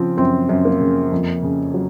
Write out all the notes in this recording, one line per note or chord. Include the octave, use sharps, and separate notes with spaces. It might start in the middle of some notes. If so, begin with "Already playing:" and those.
Already playing: C#3 F3 C4
F#2 C4
F#2
A#3
C#3
F2
C#3
F#3